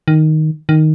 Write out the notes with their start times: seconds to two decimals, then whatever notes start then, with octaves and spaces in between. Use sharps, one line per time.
0.08 D#3
0.69 D#3